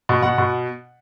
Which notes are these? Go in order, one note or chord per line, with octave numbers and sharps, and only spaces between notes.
B2
B2 F#5
B2